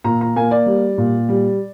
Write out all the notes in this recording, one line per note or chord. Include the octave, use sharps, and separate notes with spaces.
A#2 A#5
A#5
A#3 G#5
D5
G3
A#2
G3